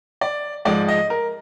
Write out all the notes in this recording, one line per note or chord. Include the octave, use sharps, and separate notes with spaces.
D5
G#2 F3 G#3 D5
D#5
A#4